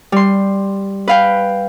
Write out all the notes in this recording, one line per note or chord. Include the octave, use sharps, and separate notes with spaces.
G3 C6
B4 F5 G5